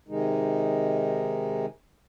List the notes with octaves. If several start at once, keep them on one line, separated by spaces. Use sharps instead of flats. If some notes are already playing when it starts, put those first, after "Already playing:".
C3 D#3 G#3 D#4